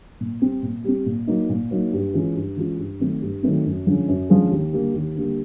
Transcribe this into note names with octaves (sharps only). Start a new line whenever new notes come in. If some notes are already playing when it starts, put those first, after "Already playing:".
A#2
G3 C4
A#2
G3 C4
A#2
F#3 A#3 D#4
A#2
F#3 A#3 D#4
G2
E3 G#3 C#4 F4
G2
E3 G#3 C#4 F4
G2
D#3 F#3 A3 C4
G2
D#3 F#3 A3 C4
F#2
D3 F3 G#3 C#4
F#2
D3 F3 G#3 C#4
D#2
D3 G3 A#3
D#2
D3 G3 A#3